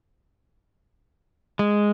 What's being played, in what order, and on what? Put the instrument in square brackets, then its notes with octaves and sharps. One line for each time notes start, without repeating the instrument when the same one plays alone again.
[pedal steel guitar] G#3